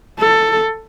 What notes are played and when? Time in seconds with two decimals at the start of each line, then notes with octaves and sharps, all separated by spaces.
0.20 A4